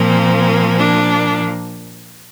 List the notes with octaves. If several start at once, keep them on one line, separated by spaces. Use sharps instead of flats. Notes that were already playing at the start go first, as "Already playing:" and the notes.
Already playing: A#2 F3 A#3 C4
D4